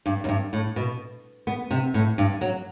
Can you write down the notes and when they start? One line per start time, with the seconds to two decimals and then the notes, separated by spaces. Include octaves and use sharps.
0.06 G2
0.24 F#2
0.29 G2
0.53 A2
0.76 B2
1.47 B3
1.71 C3
1.94 A2
2.18 G2
2.41 F#3